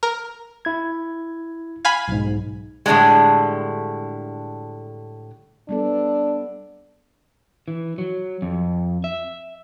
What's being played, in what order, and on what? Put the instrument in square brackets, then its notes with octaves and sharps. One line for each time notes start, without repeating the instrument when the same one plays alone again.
[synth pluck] A#4
[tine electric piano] E4 G#6
[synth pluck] F5 G#5 B5 [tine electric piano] G#6
[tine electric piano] B1 G#2
[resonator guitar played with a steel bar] A2 D3 F3 G3 G#3
[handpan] G3 B3 A4 [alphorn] D4
[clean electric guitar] E3
F#3
F2
E5